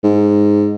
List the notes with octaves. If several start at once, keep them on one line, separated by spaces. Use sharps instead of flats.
G#2